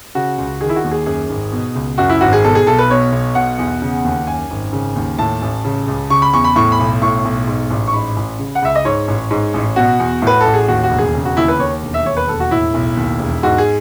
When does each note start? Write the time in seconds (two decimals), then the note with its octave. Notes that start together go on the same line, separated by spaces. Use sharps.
0.15 C#3 F#4
0.38 C#2
0.61 D#3 G#4
0.70 E4
0.76 F#4
0.84 D#2
0.91 G#4
1.06 F#2 G#4
1.29 G#1
1.52 B2
1.75 C#2
1.98 F#2 F#4
2.10 E4
2.21 G#1 F#4
2.33 G#4
2.44 B2 A4
2.55 G#4
2.67 B1 A4
2.78 B4
2.90 B2 C#5
3.12 B1
3.35 B2 F#5
3.58 E2
3.82 C#3
4.04 D#2
4.27 F#2 G#5
4.50 G#1
4.73 C#3
4.96 D#2
5.19 A2 A5
5.42 A1
5.65 C#3
5.88 C#2
6.10 C#3 C#6
6.22 B5
6.33 E2 C#6
6.44 B5
6.56 A2 C#6
6.72 B5
6.79 B1
7.02 A2 C#6
7.25 B1
7.47 G#2
7.70 A1
7.87 C#6
7.93 G#2 B5
8.16 A1
8.39 C#3
8.55 F#5
8.62 C#2 E5
8.75 D#5
8.85 G#2 C#5
9.08 A1
9.31 G#2
9.54 A1
9.76 B2 F#4
9.99 E2
10.22 A2 B4
10.41 A1 A4
10.54 G#4
10.68 D#2 F#4
10.83 F#4
10.91 E1
10.98 G#4
11.14 C#3
11.25 F#4
11.37 D#2 E4
11.48 B4
11.59 D#2 C#5
11.82 E1
11.94 E5
12.05 D#2 C#5
12.17 B4
12.28 E1 A4
12.40 F#4
12.51 A2 E4
12.74 B1
12.97 D#2
13.20 E1
13.43 G#2 F#4
13.58 G#4